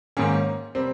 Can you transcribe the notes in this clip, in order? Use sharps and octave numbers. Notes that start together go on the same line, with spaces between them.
G#2 D#3 A#3 C#4
C3 G3 C4